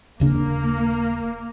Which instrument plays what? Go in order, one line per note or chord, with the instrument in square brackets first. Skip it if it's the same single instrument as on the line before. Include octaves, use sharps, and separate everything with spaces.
[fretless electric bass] D#1 C#3 D4 [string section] A#3